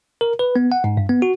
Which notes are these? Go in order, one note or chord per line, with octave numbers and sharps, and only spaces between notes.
A#4
B4
B3
F#5
G#2
G2
B3
F#4